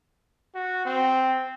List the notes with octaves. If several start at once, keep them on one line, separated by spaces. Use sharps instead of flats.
F#4
C4